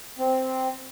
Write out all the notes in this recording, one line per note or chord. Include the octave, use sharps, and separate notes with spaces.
C4